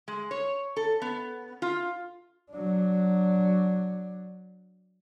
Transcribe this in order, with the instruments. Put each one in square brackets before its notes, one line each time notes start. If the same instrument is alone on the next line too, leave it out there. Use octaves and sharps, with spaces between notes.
[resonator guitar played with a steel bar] G#3
C#5
A4
B3
F4
[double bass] F#3 D4